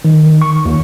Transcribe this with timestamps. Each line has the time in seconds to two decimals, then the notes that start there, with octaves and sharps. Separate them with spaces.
0.05 D#3
0.42 C#6
0.65 D#2